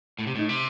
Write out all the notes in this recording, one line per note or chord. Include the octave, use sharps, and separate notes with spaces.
A2
C3
A2 D#4
C3